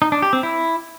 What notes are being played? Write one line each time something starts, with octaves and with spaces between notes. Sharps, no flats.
D#4
D4
G4
C4
E4